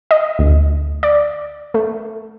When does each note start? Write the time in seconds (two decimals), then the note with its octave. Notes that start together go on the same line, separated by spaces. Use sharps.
0.11 D#5
0.39 D2
1.03 D5
1.74 A3